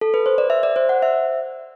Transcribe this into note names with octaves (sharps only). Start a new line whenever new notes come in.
A4
B4
C5
D5
E5
D5
C5
F#5
E5